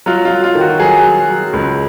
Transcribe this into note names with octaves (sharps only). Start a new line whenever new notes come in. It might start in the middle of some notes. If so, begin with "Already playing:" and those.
F#3 F4
F4
F#3
F4
D#3
F#4
F#3 G#4
F#3
F#3
C#2